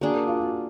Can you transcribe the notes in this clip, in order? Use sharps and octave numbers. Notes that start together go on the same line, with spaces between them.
A#3 D4 F#4 G#4
A#4
F4
F#4